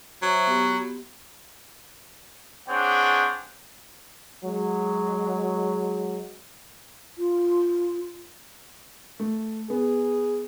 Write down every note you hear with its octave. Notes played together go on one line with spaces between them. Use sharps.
F#3 C5 C#5 E5
B3 G4 C6
C4 D4 G#4 C#5 F#5 G5
F#3 G#3
F4
A3
B3 G#4